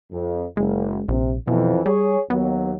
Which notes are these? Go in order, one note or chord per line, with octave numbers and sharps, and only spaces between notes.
F2
F#1 G#3
A#1 C3
F2 B2 E3 F3
G3 G#4 C#5
D#2 F#3 B3